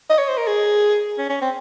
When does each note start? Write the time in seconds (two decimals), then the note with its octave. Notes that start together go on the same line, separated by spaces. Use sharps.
0.10 D#5
0.18 C#5
0.28 C5
0.38 A#4
0.47 G#4
1.19 C#4
1.30 C#4
1.41 C4